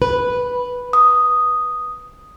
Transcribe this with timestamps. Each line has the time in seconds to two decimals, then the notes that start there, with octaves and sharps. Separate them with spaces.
0.02 B4
0.93 D#6